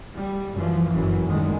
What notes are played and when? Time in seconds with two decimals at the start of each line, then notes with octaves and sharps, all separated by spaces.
0.16 G3
0.54 F#2 E3 F3
0.91 G1 F#2 E3
1.28 F#2 A2 D3 D#3 G#3